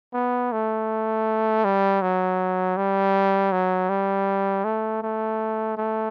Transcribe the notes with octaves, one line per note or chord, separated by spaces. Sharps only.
B3
A3
G3
F#3
G3
F#3
G3
A3
A3
A3